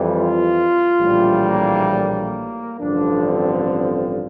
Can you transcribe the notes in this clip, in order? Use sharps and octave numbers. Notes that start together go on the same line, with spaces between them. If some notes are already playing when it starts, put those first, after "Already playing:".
Already playing: F2 E3 G3
F4
A#1 A2 E3 G3
A#3
A#3
A1 G2 D3 F3 D4
C4